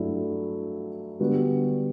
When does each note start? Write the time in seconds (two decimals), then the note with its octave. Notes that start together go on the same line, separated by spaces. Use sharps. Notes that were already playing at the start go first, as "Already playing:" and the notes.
Already playing: G2 F#3 A3 E4
1.20 D3 G3 B3 F#4